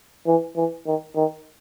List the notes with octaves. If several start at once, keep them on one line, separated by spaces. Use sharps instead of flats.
E3
E3
D#3
D#3